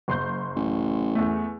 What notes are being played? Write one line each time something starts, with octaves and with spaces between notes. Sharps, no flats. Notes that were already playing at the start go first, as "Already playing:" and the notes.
F#1 C6 G6
A1
E2 A3